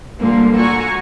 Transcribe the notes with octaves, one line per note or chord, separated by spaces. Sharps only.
A#2 D3 F3 G3 A#3
F#4 A4 G#5 A#5 C#6